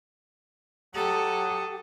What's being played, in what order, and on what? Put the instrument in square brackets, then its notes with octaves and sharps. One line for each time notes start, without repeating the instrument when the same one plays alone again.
[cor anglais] F#3 [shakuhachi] G4 [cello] A4 [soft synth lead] D#6